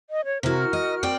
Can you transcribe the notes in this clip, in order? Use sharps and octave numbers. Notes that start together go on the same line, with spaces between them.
D#5
C#5
C3 E4 F#4 A#4 F6
D#5
C4 D5 G5